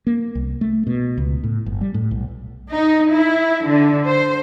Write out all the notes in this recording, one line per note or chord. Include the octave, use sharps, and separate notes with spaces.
A#3
C2
A3
B2
C#2
A2
G1
G3
A2
B1
D#4
E4
D3
C5